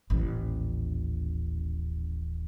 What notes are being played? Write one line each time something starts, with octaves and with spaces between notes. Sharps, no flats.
D#1 A1